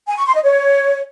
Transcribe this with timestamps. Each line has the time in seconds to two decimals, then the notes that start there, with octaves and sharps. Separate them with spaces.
0.08 G#5
0.17 C#6
0.26 C6
0.35 D#5
0.43 C#5